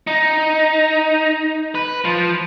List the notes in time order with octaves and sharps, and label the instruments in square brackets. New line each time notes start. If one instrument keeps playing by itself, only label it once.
[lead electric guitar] D#4
B4
F3